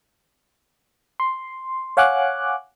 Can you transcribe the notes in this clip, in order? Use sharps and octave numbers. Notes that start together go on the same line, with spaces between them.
C6
C#5 F5 F#5 G#5 D6 F#6